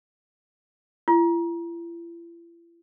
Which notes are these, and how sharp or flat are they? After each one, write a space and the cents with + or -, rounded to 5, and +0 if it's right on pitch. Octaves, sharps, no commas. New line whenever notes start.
E4 +45